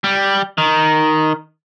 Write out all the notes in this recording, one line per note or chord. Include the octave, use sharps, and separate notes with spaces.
G3
D#3